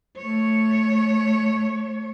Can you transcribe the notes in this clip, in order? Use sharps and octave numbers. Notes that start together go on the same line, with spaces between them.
A3 C#5